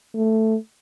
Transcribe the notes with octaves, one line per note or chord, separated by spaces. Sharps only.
A3